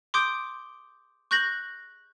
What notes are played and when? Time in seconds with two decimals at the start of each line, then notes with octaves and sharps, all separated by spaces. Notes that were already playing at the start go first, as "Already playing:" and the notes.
0.14 C6 D6 D#6 G6 D7
1.31 C#6 F#6 G6 A#6 F#7